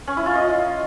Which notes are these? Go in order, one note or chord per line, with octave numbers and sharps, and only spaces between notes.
C#4
E4
F4
D#5